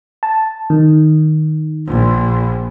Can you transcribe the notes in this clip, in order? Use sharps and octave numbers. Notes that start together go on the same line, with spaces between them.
A5
D#3
A#1